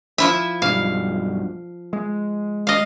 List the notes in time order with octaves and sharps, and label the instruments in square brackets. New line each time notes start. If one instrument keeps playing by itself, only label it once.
[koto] F3 E4 E5
[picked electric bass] B1 G2 [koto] F5
[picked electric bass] G#3
[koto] D#5 F5